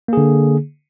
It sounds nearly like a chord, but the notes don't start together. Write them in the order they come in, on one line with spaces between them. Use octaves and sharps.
A#3 G#4 D3